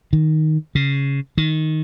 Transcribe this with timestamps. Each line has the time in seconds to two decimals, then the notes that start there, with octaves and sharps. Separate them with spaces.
0.13 D#3
0.75 C#3
1.38 D#3